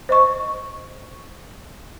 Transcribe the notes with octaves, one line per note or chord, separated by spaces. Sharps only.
C5 D#5 C#6